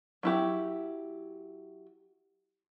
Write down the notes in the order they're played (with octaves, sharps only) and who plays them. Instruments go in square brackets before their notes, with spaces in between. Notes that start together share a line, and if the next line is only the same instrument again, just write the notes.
[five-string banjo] F#3 E4 G4